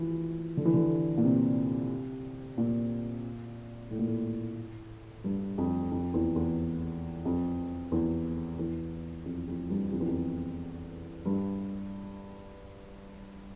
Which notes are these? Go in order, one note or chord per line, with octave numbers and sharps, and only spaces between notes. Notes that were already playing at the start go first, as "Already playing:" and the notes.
Already playing: E3 F3
D3
E3
D3
A#2
C3
A#2
A2
A#2
A2
G2
F2
F2
E2
E2
F2
E2
E2
F2
F2
G2
F2
E2
F2
G2